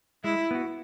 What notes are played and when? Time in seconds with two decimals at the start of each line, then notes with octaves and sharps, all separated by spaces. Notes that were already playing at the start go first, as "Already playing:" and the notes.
0.24 G#3 E4
0.51 B3 F#4